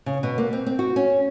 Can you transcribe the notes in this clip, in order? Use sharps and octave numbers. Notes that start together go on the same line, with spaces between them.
C#3
B2
A#3
C4
C4
F#4
C#4